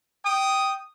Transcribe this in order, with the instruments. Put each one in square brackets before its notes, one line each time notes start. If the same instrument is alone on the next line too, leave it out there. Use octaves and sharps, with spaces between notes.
[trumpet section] G5 D#6